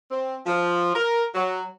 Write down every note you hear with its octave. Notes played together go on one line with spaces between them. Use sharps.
C4
F3
A#4
F#3